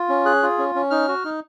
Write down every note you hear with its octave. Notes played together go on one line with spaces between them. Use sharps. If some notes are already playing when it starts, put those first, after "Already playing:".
Already playing: F4
C#4
G#4 F#6
F4
C#4
C#4
D#4 F6
F#4
D#4